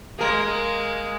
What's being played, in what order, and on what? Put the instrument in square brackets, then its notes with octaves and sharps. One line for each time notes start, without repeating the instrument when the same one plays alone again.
[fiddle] G#3 [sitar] A#3 A#4